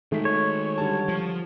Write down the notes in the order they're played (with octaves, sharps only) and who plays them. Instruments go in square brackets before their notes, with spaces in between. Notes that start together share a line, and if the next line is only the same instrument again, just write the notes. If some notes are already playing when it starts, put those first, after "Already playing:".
[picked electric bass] D#3 G#3 [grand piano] A3 D#4 B6
[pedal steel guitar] C#5
[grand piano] D3 G3 A5
[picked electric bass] F3